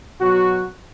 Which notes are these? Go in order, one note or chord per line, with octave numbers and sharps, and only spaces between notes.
B2 F#3 F#4